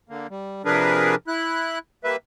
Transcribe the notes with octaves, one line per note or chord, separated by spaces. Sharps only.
D3 A#3
G3
C3 F3 D4 G#4 A#4 B4
E4 F#6
G3 A#3 B4 E5